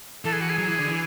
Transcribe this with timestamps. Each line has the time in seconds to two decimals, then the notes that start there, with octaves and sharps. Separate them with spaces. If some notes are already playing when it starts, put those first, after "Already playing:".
0.24 E3 A4
0.33 G#4
0.41 F#4
0.50 G#4
0.58 F#3
0.68 E3
0.79 D3
0.88 E3